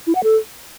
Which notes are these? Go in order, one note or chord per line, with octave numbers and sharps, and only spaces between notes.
E4
F#5
A4